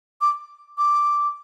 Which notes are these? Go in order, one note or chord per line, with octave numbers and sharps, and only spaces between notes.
D6
D6